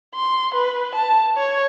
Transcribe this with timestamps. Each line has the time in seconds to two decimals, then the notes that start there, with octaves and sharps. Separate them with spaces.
0.15 C6
0.55 B4
0.95 A5
1.37 C#5